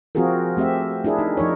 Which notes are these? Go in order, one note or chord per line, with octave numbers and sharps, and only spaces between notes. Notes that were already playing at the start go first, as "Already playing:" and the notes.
F3 C4 F4 F#4 G#4 A#4
A3 C4 G4 E5
D4 E4 G#4 A#4
D#4
F3 D#4 A#4 C#5